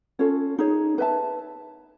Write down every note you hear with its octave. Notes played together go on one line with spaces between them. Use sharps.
C#4 F4 A4 C#5
D#4 G#4 C#5
B4 E5 A5